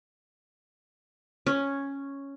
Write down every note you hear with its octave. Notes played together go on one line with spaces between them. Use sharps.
C#4